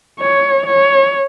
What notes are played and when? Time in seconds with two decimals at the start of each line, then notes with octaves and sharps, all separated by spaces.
0.21 C#5
0.66 C#5